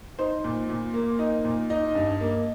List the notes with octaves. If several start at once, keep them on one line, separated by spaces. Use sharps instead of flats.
D#4 C5
A#2
A#2
A#3
D#4
A#2
D#4 D#5
G2
A#3